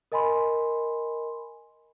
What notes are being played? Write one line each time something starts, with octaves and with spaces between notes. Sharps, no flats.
A#4 D#5 G#5 B5 C6